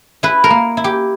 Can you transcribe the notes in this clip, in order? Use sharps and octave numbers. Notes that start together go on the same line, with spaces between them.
E4 B4
A#4
A#3
E4
G4